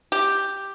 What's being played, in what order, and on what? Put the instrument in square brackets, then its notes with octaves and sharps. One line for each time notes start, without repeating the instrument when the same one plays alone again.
[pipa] G4